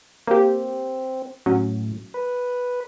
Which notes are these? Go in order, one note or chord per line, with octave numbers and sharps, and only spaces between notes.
A#3 C4 G4
A2 F#3 C#4
B4